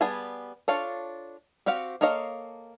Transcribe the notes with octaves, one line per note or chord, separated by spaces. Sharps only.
G3 B3 G#4 G#5 A5
D4 F4 A4 C#5 F5
C4 F#4 G4 F5 F#5
A#3 A4 C#5 D#5 F5